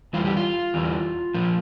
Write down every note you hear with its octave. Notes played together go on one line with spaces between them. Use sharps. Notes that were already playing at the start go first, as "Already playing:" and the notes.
E2 E3 G3 F4
G4
F4
E2 E3 G3
A#2 F3